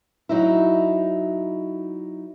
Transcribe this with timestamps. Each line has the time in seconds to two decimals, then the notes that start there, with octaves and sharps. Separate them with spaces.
0.29 F#3 D#4 E4